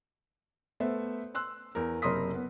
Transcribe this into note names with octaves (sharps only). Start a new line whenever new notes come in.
A3 B3 C5 E5
C6 E6 F#6
E2 A#4
F#1 C3 A#4 C6 D#6 B6
B3